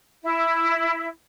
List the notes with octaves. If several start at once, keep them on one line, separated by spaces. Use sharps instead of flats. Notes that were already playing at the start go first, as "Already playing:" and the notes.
E4